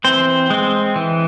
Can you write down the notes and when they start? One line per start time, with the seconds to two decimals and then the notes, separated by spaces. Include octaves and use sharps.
0.04 E3 C4 C5
0.50 G#3 C4
0.96 E3